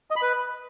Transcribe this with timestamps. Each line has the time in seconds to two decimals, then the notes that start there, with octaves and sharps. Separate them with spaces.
0.10 D#5
0.16 B5
0.22 B4